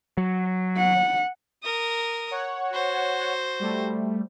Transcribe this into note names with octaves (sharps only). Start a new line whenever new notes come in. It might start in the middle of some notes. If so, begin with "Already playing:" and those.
F#3
F#5
A#4 D#6
C#5 F#5
F#4 C5
G3 A3